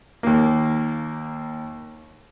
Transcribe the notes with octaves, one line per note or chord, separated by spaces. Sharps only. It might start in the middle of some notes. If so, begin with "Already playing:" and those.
D#2 A#3